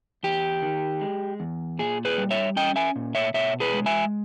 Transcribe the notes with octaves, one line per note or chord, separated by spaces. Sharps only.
E2 G4
D#3
G#3
E2
A#2 G#4
G#4 B4
G3
C#5 E5
C#4 D#5 G5
E5 G#5
A#2
C#5 E5
B2 C#5 E5
G#4 B4
G#3
E5 G#5